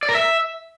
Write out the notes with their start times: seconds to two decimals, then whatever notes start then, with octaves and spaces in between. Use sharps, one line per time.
0.03 D5
0.09 A#4
0.15 E5